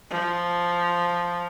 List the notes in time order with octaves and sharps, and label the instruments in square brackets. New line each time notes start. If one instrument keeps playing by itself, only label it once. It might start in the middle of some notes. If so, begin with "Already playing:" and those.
[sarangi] F3